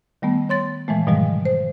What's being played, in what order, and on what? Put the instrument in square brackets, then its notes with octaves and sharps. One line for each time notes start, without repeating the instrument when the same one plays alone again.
[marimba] D#3 G3 A3 B3
C#5 C6 A6
A#2 E3 F3 G#3 A3
G#2 B2 D#3 F3 G3 G#3
C5